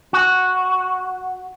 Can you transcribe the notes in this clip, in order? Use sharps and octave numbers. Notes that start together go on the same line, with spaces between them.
F#4